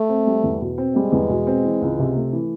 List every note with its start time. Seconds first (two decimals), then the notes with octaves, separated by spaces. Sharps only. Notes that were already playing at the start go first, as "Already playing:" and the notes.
Already playing: A3
0.09 C4
0.27 G3
0.44 E2
0.61 B2
0.78 C4
0.95 G3 G#3
1.12 E2
1.29 B2
1.47 C4
1.65 E3
1.82 C#2
1.99 C3
2.16 A3
2.33 E3